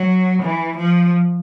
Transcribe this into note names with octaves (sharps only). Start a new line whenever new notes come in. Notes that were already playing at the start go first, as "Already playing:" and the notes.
Already playing: F#3
E3
F3